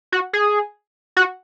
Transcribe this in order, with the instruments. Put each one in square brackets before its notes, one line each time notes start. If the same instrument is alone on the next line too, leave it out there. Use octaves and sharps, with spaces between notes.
[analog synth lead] F#4
G#4
F#4